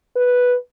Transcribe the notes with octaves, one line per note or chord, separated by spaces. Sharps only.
B4